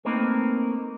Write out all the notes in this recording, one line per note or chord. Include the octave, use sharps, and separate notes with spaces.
A3 A#3 C4 D#4 A#4 B4